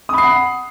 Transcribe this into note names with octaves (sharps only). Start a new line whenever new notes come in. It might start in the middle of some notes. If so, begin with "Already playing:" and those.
F#5 B5 D#6 C7